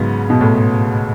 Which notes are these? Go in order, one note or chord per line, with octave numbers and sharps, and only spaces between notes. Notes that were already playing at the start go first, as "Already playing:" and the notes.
Already playing: G#2 C#3 F#3 B3
B2
A2